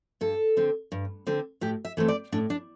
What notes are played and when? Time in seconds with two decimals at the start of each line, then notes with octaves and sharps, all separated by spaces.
0.21 G2 A4
0.57 D3 C4
0.92 G2
1.27 D3 C4
1.61 A2 G4
1.85 E5
1.97 E3 A3 C4
2.08 D5
2.32 A2 D4
2.50 D4